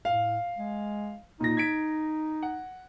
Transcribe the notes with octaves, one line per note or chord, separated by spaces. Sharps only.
A2 F5
G#3
A#2 D#4 A#6
G#6 B6 D7
F#5